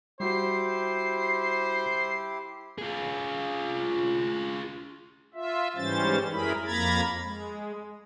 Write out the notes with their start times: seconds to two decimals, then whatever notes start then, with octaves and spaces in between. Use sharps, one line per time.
0.20 G3 E4 F#4 G4 C5 C7
2.78 F4 G#4
5.34 F4 E5
5.76 G#2 E3 G3 C#4 C5 A6
6.32 F#2 E4 G#4 A#4 B5
6.66 F2 A#3 A#5 B5 G#6 A6
7.22 G#3